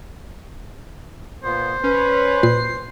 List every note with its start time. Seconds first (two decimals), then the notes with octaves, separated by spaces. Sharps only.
1.44 A#2 B3 C5
1.84 C#4 B4
2.43 A#2 C7